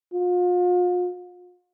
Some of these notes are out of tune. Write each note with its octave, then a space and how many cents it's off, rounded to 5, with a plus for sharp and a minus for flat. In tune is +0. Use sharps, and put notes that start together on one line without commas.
F4 +40